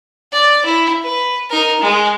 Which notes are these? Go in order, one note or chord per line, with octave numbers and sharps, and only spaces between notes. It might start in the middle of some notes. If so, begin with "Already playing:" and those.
D5
E4
B4
D#4 A#4
G#3